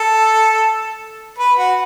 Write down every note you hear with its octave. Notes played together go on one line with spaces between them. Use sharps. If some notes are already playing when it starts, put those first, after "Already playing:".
Already playing: A4
B4
F#4